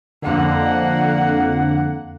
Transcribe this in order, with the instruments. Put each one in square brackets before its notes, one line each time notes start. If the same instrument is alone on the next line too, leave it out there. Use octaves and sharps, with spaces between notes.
[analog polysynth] F2 D3 [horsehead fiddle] A#3 F#5